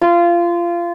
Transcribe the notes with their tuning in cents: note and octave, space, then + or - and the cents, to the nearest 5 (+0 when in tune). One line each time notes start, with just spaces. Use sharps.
F4 -20